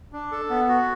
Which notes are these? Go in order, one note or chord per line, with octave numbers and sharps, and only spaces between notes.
D4
A4
B3
F#4